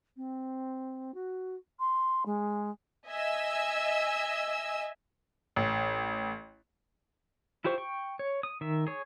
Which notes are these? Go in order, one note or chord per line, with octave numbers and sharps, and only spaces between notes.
C4
F#4
C6
G#3
D#5 E5 G#5 E6
A1
E4 F4 G4 C5 C#6
G5 C#6
C#5
D#6
D#3 E5
G#4 C#5